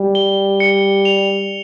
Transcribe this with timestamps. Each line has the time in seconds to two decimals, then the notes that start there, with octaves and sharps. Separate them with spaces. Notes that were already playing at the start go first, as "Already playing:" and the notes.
Already playing: G3
0.15 G7
0.60 C#7
1.05 F7